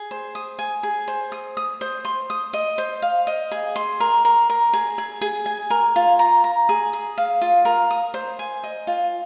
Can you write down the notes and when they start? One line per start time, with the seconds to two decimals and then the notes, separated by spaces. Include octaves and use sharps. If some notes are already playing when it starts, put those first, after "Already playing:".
Already playing: G#4
0.11 C5
0.35 D#6
0.59 G#5
0.83 G#4
1.08 C5
1.32 D#6
1.57 D#6
1.81 C5
2.05 C6
2.30 D#6
2.53 D#5
2.78 C5
3.02 F5
3.27 D#5
3.52 G#4
3.76 C6
4.00 A#4
4.25 A#4
4.50 A#4
4.73 G#4
4.98 G#4
5.21 G#4
5.46 G#5
5.70 A#4
5.96 F4
6.19 A#5
6.44 A#5
6.69 G#4
6.93 G#4
7.18 F5
7.42 F4
7.65 A#4
7.90 D#6
8.14 C5
8.39 G#5
8.64 D#5
8.87 F4